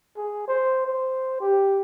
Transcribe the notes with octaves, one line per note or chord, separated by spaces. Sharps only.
G#4
C5
C5
G4